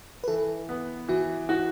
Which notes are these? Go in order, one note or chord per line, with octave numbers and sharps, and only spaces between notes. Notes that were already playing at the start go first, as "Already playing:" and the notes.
B4
E3 A4
B3
E3 F#4
E4 F#4